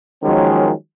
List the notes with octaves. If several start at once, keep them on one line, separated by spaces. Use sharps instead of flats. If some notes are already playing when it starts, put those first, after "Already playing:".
D#3 F3 F#3 G#3 A#3 C#4